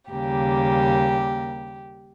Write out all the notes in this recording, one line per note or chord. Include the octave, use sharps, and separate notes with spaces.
D#2 C#3 G3 A#3 G4